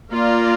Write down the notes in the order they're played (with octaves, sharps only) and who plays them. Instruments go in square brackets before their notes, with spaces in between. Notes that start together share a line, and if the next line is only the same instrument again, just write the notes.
[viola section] A#3 F4 A#4 D5